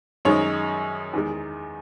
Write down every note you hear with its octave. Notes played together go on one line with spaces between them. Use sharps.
F#2 D#3 G#3 D#4 C#5
E2 D#3 G#3